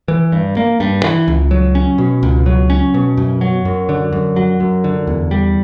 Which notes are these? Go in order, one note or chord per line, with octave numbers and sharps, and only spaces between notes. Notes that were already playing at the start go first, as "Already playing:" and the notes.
E3
G2
A#3
G2
E3
C#2
F#3
C#4
B2
C#2
F#3
C#4
B2
F#2
F#3
F#2
D3
F#2
F#3
F#2
D3
E2
G3